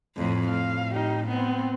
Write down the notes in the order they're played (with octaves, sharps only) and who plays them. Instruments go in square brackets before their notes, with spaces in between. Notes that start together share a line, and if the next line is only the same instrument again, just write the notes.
[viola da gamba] F2 A2
[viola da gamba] A2 [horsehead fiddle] F5
[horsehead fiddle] D#4 G4
B3 C4